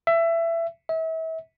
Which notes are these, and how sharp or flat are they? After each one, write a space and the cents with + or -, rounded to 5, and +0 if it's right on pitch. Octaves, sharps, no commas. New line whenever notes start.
E5 +20
E5 -35